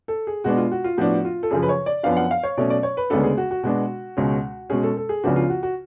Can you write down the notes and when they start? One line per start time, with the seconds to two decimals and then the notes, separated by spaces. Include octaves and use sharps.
0.08 A4
0.27 G#4
0.44 B2 G#3 B3 D4 F#4
0.57 F4
0.71 F#4
0.84 F4
0.98 A2 F3 B3 D4 F#4
1.25 F4
1.43 A4
1.51 F#2 C#3 F3 G#4
1.62 B4
1.69 C#5
1.86 D5
2.03 F#2 F3 B3 D4 F5
2.17 F#5
2.31 F5
2.43 C#5
2.57 B2 F#3 A3 C#4 D5
2.70 D5
2.83 C#5
2.97 B4
3.10 D2 C#3 G#3 B3 D4 A4
3.24 G#4
3.37 F#4
3.51 F#4
3.63 B2 G#3 B3 D4 F#4
4.17 C#2 B2 G#3 C#4
4.70 B2 G#3 C#4 G#4
4.83 A4
4.97 A4
5.09 G#4
5.24 C#2 C#3 F3 B3 D4 F#4
5.36 F4
5.50 F#4
5.63 F#4